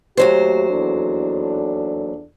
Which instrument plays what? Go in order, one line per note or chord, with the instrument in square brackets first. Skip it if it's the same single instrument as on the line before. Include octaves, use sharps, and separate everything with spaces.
[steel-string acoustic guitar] D#2 F#3 C5 [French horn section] A3 G4
[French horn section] E2 D4 A4